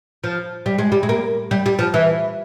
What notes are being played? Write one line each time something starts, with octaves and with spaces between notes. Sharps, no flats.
F3
G3
G#3
G3
G#3
A#3
G3
G3
F3
E3